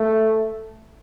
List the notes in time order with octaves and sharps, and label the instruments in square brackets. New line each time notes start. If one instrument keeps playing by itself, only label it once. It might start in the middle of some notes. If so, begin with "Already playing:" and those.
Already playing: [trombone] A3